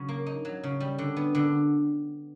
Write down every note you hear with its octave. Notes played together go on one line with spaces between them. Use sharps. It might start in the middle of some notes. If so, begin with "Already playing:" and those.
Already playing: C#3 F#3
A#3
D#4
F#3
C#3
G3
D3
B3
D3